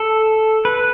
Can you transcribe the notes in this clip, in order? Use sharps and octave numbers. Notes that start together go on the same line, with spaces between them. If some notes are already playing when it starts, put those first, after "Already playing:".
Already playing: A4
B4